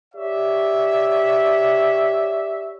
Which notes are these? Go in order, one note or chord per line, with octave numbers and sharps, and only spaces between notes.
G4 C#5 D5 E5